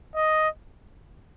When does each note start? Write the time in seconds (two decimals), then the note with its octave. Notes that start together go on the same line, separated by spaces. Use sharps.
0.15 D#5